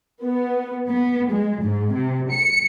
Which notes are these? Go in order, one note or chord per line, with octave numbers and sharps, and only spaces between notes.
B3
B3
G#3
G#2
C3
C#7